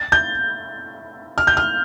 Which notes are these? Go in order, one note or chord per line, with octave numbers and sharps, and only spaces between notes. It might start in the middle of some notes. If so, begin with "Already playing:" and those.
Already playing: A6
G6
F6
G6
F6